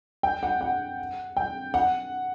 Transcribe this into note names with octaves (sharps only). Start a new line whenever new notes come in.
G5
F#5
F#5
G5
F#5